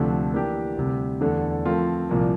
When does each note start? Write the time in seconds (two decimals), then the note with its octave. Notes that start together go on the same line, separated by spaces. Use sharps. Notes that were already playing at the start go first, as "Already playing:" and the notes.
Already playing: D2 C3 F3 A3 D4
0.33 E3 A#3 D4 G4
0.77 D2 C3 G3
1.21 E2 D3 A3 D4 A4
1.65 F3 A3 C4 F4 A#4
2.10 C2 A#2 F3 A#3